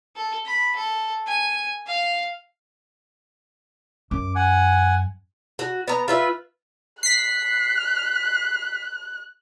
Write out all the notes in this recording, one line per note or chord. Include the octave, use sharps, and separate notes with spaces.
A4
B5
A4
G#5
F5
F#2 D6
F#5 G#5
F#4
B3 A#5
F4 B4 E5
F#6 B6 C7